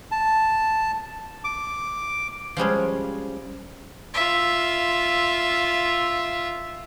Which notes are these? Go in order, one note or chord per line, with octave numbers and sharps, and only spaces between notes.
A5
D6
F3 G3 G#3 C#4
F4 E5